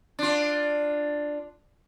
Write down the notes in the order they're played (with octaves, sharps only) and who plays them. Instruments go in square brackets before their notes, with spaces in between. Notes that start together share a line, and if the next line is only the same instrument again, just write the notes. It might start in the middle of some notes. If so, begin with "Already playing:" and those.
[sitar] D4 F4